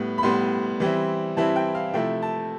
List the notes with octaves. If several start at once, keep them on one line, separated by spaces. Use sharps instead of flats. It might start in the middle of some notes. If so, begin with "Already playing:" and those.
Already playing: A2 G3 B3
B5
A2 G3 B3 C6
E3 G3 C4 E4
E3 G3 C4 E4 A5
G5
F5
C3 F3 A3 E4 G5
A5